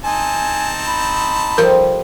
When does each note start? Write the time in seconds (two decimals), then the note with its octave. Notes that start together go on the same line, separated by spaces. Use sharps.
0.04 C4 D#4 G#5 A5
0.86 B5
1.58 F3 G3 A4 A#4